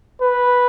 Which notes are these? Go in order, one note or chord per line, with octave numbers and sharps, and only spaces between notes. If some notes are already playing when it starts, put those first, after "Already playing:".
B4